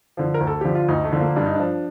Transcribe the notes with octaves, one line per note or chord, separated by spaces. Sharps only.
D3 F3
A#4
D2
A4
D3 F3 G4
F4
D2 D#4
A3
D3 F3
A#3
G2 D4
D#4
F3 D4